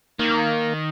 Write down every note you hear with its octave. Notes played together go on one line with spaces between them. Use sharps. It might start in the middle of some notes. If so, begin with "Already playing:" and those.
D#3 A#3